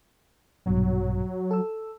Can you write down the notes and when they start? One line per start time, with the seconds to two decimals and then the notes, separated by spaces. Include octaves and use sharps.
0.66 A#1 G2 B2 F#3
1.51 A4 E6